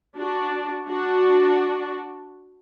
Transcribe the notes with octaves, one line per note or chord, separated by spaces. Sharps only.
D4 F#4
D4 F#4